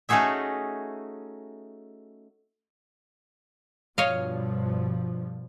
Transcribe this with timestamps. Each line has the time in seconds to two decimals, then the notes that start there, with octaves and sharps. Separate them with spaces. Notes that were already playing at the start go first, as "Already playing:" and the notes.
0.09 A3 C#4 D#4 F#4 G#4 E5
3.98 G2 B2 F3 C#5 D#5 F5